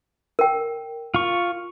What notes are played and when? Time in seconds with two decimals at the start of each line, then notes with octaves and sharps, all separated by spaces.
0.39 A#4 G5
1.14 F4 C#6